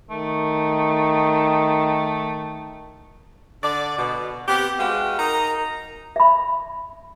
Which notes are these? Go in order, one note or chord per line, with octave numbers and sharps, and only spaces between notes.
D#3 A3
D3 D5
B2
B3 C4 G4
G#3 F#4 B4 F5 G5
D#4 A#4 D#5 A#5
E5 B5